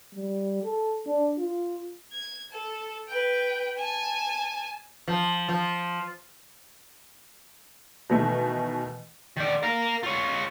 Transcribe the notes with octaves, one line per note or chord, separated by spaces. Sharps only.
G3
A4
D4
F4
G#6
A4
B4 G5
G#5 A5
F3
F3
B2 D#3 E3 A3
D#3 D5
A#4 F5
F4 C#5